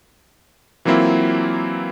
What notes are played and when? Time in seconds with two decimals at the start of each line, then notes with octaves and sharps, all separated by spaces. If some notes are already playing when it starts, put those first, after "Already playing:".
0.85 E3 F#3 A#3 C4 E4 F4